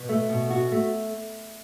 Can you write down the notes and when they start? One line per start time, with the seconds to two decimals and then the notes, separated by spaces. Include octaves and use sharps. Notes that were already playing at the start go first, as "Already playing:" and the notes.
Already playing: B2
0.09 A3
0.29 B2
0.50 F#4
0.71 A3